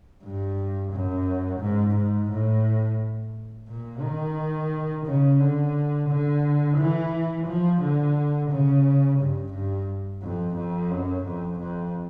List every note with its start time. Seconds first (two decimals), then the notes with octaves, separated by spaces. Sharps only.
0.24 G2
0.92 F#2
1.61 G#2
1.95 G#2
2.30 A2
3.68 A#2
4.01 D#3
5.06 C#3
5.40 D3
6.09 D3
6.78 E3
7.46 F3
7.81 D3
8.50 C#3
9.18 G2
9.53 G2
10.22 F2
10.56 F2
10.90 F#2
11.25 F2
11.59 F2